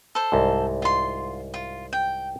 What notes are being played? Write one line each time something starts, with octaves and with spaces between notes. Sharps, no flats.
A4 C5
C2 G#2
F4 C6
F4
G5